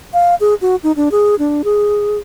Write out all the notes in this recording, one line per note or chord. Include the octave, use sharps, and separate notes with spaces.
F5
G#4
F#4
D#4
D4
G#4
D4
G#4